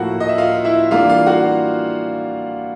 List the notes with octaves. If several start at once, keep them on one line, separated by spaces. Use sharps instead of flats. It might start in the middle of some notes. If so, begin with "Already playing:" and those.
Already playing: A2 F3 A#3 F#4 F#5
D#5
E5
F4 F5
E4 E5
E3 G3 A#3 D4 F4 F5
F4 F5
F#4 F#5